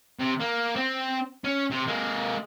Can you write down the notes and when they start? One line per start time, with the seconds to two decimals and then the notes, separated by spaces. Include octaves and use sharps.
0.20 C3
0.40 A#3
0.76 C4
1.44 C#4
1.71 C3
1.88 G#3 A#3